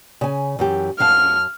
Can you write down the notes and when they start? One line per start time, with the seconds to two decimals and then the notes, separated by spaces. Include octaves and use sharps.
0.21 C#3 G#5
0.59 F#2 E3 G4
1.00 F#2 F5 A5 F6